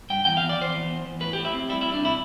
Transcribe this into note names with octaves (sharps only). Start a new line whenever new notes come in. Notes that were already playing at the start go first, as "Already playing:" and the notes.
G2 G5
E2 G5
F5
E2
D5
E2 C5
E2
E2
E2
A2 B4
G4
A2
E4
C4
G3 E4
E4
G3
D4
C3 E4